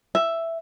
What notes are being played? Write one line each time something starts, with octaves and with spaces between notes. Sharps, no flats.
E5